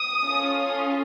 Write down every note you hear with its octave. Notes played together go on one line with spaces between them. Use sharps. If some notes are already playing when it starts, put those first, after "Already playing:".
Already playing: D#6
C#4 F4 A4